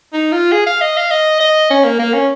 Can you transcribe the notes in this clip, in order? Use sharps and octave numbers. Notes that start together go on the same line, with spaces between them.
D#4
F4
G#4
F5
D#5
F5
D#5
D#5
C#4
A#3
A#3
C#4